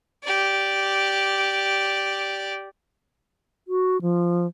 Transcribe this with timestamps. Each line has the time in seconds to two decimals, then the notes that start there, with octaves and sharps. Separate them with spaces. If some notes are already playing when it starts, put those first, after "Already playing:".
0.23 G4 D5
3.68 F#4
4.02 F3